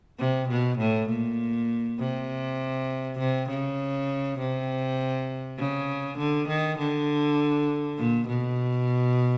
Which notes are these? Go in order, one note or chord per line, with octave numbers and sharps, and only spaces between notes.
C3
B2
A2
A#2
C3
C3
C#3
C3
C#3
D3
D#3
D3
A#2
B2